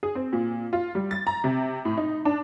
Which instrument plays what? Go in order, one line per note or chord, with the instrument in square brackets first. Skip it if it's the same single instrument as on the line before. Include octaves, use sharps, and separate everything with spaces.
[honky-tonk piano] G#4
C4
A#2
F4
G3
A6
A#5
C3
A2
D#4
D4